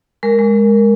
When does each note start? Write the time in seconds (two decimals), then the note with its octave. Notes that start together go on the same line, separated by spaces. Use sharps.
0.23 G#3 A#4
0.39 G#3